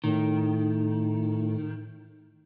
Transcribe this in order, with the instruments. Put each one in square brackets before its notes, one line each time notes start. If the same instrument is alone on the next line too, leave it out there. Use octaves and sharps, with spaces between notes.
[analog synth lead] A2 [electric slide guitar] D#3